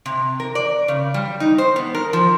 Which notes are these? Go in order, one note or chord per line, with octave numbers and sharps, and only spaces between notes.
C3
A#4
D5
C#3
G3
D#4
C5
B3
A#4
F3